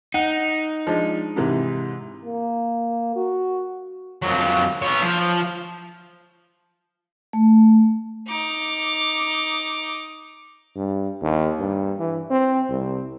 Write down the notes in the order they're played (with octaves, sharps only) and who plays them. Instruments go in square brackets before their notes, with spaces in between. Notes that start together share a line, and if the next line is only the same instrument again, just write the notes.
[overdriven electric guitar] D#4 [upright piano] F#5
[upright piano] F3 G#3 D4
G#2 C3 E3
[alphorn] A#3
F#4
[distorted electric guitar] F2 F#3
B3 C#5
F3
[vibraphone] A3
[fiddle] D#4 D6
[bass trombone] G2
D#2
G2
E3
C4
C2